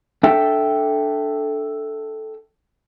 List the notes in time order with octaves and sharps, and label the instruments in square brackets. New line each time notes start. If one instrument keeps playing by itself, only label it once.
[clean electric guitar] D4 A4 E5 G5